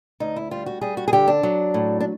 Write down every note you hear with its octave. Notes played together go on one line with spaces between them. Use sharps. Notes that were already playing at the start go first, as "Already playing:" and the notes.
D2 D#4
E4
G3 F4
F#4
G3 G#4
F#4
G#4
D3 G4
D4
F#3
A2
D4